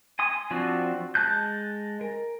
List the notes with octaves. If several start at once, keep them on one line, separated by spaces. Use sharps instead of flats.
G#5 C6 D#6
F3 C4 D4 F#4
G#3 A5 F#6 G6
A#4